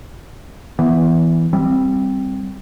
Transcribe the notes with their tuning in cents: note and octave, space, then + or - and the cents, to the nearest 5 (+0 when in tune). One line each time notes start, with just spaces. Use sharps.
E3 +0 B3 -15
G3 +0 C4 +0